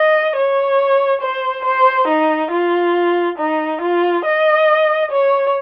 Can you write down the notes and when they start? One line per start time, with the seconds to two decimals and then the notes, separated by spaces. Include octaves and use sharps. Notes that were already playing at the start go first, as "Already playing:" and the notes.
Already playing: D#5
0.35 C#5
1.21 C5
1.65 C5
2.08 D#4
2.51 F4
3.38 D#4
3.81 F4
4.25 D#5
5.11 C#5